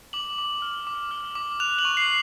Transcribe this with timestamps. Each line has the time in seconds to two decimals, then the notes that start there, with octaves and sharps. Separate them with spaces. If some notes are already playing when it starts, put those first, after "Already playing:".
0.13 D6 F#7
0.38 D6
0.62 F6
0.87 D6
1.11 F6
1.35 D6
1.60 F#6 F7
1.79 F#7
1.85 C#6
1.97 C7